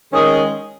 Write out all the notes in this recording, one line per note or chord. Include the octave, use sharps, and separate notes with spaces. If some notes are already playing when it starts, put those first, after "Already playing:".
D#3 G#3 C#4 G#4